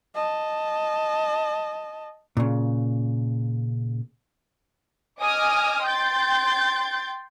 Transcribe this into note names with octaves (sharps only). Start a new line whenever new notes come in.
D#5 A5
A#2 C#3
D#5 G#5 D6 D#6 F6
G5 C6 G6 A6